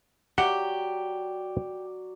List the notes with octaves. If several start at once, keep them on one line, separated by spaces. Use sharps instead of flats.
F#3 G4 D5 E5 F#5